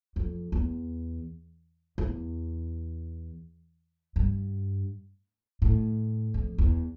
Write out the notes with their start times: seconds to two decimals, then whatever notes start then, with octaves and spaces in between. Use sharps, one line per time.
0.16 F2
0.52 E2
1.98 E2
4.16 G2
5.62 A2
6.34 F2
6.58 E2